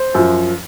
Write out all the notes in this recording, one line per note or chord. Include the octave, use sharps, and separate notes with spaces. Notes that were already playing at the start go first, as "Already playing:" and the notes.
Already playing: C5
F#2 F3